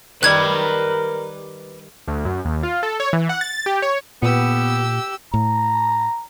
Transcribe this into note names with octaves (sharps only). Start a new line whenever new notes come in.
D#3 G3 A#4 B4 D5 F#6 G#6
D2
F#2
D#2
F4
A4
C#5
E3
F#5
A6
G4
C#5
A#2 B3 G4 E6
A2 A#5